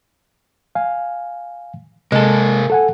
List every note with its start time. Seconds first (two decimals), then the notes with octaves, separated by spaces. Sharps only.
0.75 F5 G#5
2.12 C3 G#3 A#3 G#4 A4
2.70 A4 F#5 G#5